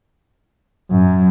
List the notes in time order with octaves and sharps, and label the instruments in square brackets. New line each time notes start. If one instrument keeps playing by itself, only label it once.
[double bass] F#2